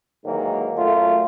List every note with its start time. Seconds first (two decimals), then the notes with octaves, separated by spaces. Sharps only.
0.25 D#2 G#2 D#3 E3 F#3 A#3
0.78 F#2 F#3 A3 F4